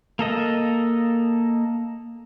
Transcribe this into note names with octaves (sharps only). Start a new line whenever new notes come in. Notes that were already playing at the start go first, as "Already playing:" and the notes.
A#3 A4 D#5